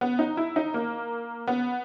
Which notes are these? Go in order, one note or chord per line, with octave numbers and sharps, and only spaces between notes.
B3
D#4
E4
D#4
A#3
B3